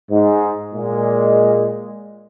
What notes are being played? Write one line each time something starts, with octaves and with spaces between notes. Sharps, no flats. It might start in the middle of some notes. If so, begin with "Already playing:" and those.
G#2
A#2 G#3